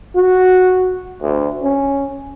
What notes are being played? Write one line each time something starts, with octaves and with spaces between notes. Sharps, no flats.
F#4
D2
C#4